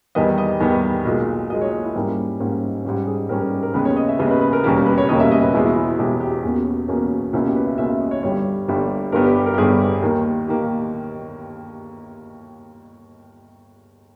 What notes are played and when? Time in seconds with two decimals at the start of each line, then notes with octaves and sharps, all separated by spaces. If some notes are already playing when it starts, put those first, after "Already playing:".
0.15 E2 D#3 G3 B3 D#5
0.38 D#5
0.60 E2 D#3 G3 B3
1.05 B1 A#2 G#3
1.49 B1 A#2 G#3 D#5
1.61 C#5
1.72 D#5
1.84 E4
1.95 G#2 G3 A#3 C#4
2.40 G#2 G3 A#3 C#4
2.85 G#2 G3 C#4 G4
3.07 G#4
3.29 G#2 G3 C#4 A#4
3.41 A#4
3.52 G4
3.63 A#4
3.74 D#2 C#3 G#3 B3 B4
3.85 C#5
3.96 D#5
4.09 E5
4.19 D#2 C#3 G#3 B3 D#5
4.31 B4
4.41 B4
4.53 A#4
4.64 E1 D#2 C#3 G3 A#3 G4
4.86 B4
4.98 C#5
5.08 E1 D#2 C#3 G3 A#3 D#5
5.20 E5
5.32 D#5
5.42 B4
5.53 E1 E2 B2 G#3 E4
5.65 E4
5.76 E4
5.88 E4
5.98 E1 E2 B2 G#3 G4
6.20 G4
6.44 E1 E2 B2 A#3 C#4
6.88 E1 E2 B2 A#3 C#4
7.33 C#2 B2 A#3 C#4 E4
7.45 G4
7.55 B4
7.67 E5
7.78 C#2 B2 A#3 C#4 E5
7.90 E5
8.01 D#5
8.11 C#5
8.23 G1 G2 G3 C#5
8.68 G1 G2 G3
9.12 G1 G2 G3 B3 A#4
9.24 G4
9.36 G4
9.46 A#4
9.54 G4
9.58 G1 G2 G3 B3 G#4
10.02 D#2 D#3 A#3
10.48 D#3 A#3 G4